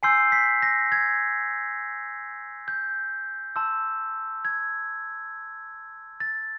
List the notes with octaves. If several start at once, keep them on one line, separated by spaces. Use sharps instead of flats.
G#5 C6 E6 G6 C7
B6
A#6
G#6
G6
A5 C6 E6
G#6
A6